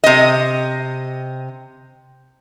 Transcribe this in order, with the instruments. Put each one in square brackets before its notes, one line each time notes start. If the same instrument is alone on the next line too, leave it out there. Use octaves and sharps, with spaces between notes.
[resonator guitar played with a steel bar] C3 D#5